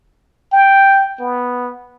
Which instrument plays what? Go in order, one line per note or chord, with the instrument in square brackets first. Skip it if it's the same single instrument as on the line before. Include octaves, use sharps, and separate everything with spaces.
[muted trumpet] G5
B3